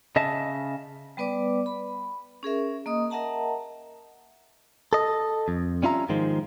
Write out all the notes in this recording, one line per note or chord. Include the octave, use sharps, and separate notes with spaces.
C#3 D#5 E5 A5
G3 B3 B4 D5 D6
B5
C#4 G#4 A#4 E5
A#3 D#5 D#6
A#4 D#5 E5 F#5 A5 A#5
A4 D#5
F2
G3 C#4 F4 E5 A#5
G#2 D#3 F3 G#3